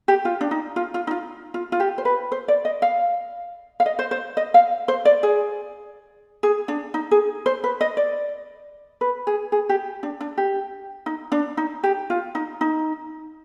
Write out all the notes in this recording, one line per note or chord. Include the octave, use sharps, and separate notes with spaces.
G4
F4
D4
D#4
F4
F4
D#4
F4
F4
F4
G4
C5
B4
C5
D5
D#5
F5
F5
D#5
C5
C5
D#5
F5
C5
D5
G#4
G#4
D4
D#4
G#4
C5
B4
D#5
D5
B4
G#4
G#4
G4
D4
D4
G4
D#4
D4
D#4
G4
F4
D#4
D#4